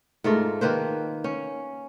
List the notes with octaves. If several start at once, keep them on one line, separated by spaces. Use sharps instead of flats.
G#2 A3 F4 A#4
D#3 A#3 B4 C5
C#4